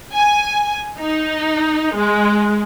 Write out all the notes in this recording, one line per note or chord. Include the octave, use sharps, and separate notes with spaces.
G#5
D#4
G#3